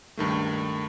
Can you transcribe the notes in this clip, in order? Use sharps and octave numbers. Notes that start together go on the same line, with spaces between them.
C#2 G2 D#3 A3